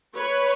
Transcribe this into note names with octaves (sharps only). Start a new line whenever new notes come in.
B4 C#5